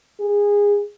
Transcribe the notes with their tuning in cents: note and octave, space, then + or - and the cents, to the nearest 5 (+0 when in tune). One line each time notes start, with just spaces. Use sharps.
G#4 -20